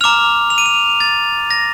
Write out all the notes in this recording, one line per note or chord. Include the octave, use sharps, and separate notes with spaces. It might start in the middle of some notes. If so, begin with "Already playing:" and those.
A#5 D6 F6 F7
F7
D#7
F7
A6
A#6